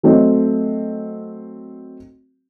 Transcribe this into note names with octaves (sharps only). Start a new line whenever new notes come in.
F#3 A3 C4 F#4 D#5